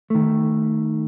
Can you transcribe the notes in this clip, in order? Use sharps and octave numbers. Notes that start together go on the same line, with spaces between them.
D#3 A3